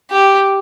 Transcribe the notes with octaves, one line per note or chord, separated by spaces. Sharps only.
G4